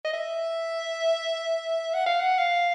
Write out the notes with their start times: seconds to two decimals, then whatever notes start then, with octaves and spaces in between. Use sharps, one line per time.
0.04 D#5
0.13 E5
1.94 F#5
2.06 F5
2.20 F#5
2.38 F5